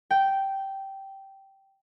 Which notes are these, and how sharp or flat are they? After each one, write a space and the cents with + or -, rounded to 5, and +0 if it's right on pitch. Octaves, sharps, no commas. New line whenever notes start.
G5 -10